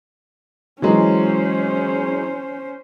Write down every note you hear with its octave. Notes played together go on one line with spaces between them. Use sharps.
E3 F#3 G#3 C#4 C5